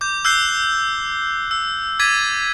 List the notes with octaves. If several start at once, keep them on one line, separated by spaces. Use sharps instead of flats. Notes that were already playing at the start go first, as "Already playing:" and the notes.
D6 G6
E6 F#6 G6 C7 G7
E6
D6 G#6 A6 B6 D#7